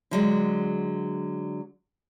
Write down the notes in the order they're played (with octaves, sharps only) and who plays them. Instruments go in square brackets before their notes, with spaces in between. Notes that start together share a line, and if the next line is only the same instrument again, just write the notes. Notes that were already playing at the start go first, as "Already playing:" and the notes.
[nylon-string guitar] D3 F#3 G#3